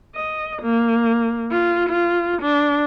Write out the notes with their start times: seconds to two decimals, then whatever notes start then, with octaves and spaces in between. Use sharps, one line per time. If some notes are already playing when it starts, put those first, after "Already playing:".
0.15 D#5
0.62 A#3
1.51 F4
1.89 F4
2.42 D4